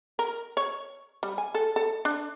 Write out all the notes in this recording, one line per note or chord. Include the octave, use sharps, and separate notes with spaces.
A#4
C#5
G3
G#5
A4
A4
D4